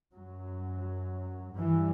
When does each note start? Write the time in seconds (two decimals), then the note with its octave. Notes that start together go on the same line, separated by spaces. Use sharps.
0.15 F#2 F#3
1.57 G2 E3